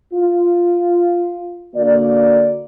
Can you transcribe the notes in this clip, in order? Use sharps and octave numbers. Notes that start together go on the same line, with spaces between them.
F4
D3 A#3 F#4 D5